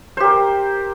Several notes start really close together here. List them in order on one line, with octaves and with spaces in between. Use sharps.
C5 G4 A#4